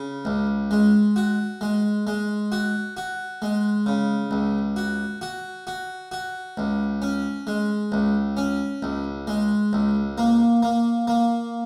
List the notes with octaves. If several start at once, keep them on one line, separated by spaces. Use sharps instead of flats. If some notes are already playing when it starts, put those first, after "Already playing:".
Already playing: C#3
C#2
G#3
F#4
G#3
G#3
F#4
F#4
G#3
C#3
C#2
F#4
F#4
F#4
F#4
C#2
C#4
G#3
C#2
C#4
C#2
G#3
C#2
A#3
A#3
A#3